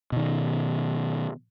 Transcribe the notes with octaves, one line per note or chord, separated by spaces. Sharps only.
B2 D#3